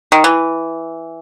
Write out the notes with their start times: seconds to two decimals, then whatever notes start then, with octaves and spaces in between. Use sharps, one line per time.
0.12 D#3
0.24 E3